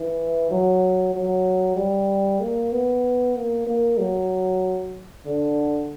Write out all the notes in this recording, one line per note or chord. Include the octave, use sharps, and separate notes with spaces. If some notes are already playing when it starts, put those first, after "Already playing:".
Already playing: E3
F#3
F#3
G3
A#3
B3
A#3
A#3
F#3
D3